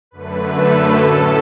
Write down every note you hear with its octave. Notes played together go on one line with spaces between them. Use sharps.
F#2 D3 A3 B4
A4
A2 F#3 C#4